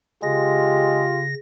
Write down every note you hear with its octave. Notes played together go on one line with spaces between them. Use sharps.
C#3 G#3 F4 G4 A#6